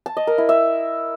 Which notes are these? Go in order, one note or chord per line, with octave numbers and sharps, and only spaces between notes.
A5
D#5
A#4
E4
E5